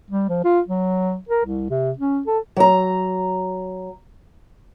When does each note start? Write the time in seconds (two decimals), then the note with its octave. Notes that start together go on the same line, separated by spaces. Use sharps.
0.10 G3
0.29 F3
0.44 F4
0.68 F#3
1.29 A#4
1.45 C2
1.70 C3
1.98 C#4
2.27 A4
2.57 F#3 A#5